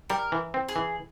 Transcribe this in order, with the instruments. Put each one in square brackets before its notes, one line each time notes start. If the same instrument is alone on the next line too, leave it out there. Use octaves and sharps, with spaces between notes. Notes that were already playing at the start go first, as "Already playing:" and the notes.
[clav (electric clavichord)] G3 [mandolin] A#4
[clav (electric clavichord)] E3
C4
[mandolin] G#4
[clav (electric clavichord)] E3